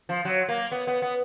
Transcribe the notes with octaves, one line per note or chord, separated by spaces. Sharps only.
F3
F#3
A#3
B3
B3
B3